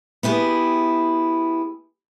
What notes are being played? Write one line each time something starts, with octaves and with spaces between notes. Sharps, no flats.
B3 E4 G4 G#4